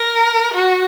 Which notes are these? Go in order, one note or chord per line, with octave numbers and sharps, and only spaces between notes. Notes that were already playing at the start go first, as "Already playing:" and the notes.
Already playing: A#4
F#4